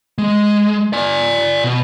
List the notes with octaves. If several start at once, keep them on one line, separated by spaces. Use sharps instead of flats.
G#3
D5 G#5
B2